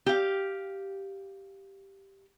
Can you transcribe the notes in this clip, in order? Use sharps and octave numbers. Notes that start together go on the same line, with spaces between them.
G4 F5